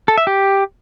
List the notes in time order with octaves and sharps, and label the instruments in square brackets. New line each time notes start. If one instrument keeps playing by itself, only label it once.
[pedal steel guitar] A4
E5
G4